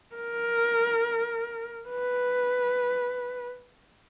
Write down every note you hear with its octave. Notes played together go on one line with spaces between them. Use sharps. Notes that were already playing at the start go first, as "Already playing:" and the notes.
A#4
B4